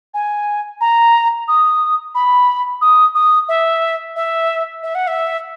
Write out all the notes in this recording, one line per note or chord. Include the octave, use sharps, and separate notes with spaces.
G#5
A#5
D#6
B5
D#6
D#6
E5
E5
E5
F#5
E5